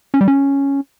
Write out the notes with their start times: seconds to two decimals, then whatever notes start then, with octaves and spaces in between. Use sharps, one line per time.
0.14 C#4
0.21 G3
0.28 C#4